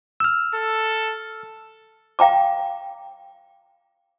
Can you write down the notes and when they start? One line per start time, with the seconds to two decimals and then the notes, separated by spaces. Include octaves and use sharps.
0.20 E6 F6
0.54 A4
2.19 F5 G5 A#5 D6